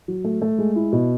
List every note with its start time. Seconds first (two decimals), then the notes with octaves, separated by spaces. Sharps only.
0.08 F#3
0.24 A3
0.42 A3
0.58 G#3
0.76 E4
0.92 B2